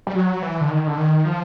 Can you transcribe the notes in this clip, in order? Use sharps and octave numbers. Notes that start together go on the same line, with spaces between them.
G3
F#3
E3
D3
D#3
D3
D#3
F3